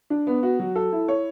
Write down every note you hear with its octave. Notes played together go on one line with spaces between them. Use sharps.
D4
B3
F#4
F#3
A4
E4
C#5